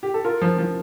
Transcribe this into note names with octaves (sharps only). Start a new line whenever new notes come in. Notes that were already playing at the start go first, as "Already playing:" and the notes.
G4
A4
F4 A#4
F3
F3